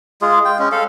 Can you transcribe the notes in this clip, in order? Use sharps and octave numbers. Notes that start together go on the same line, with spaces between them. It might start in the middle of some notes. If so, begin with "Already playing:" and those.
G#3 F4 G#4
G5
G#3 C#4
A4 F5